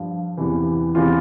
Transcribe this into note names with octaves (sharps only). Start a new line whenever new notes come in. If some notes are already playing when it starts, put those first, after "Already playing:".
Already playing: G2 F3
E2 C3 E3
E2 C3 E3 F4